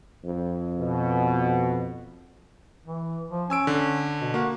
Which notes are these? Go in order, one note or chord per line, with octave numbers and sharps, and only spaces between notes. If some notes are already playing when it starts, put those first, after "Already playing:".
F2
B2
E3
F3
C#4 G#5 E6 D7
D3
B2
A#3 F#4